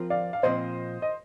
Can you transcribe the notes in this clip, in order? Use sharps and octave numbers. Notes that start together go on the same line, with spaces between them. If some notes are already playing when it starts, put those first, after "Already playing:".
Already playing: F3 C4 F4 A#4
D5 F5
F5
A#2 F3 C4 C5 D#5
D#5